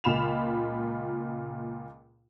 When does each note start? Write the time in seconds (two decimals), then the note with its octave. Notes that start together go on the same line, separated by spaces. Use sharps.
0.04 C#2 A#2 F4 B5 E7 F7